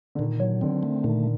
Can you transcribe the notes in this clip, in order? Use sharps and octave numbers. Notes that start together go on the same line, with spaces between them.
D3
A#2 D#3
F#3
D3 C4
A3
A#2 D#3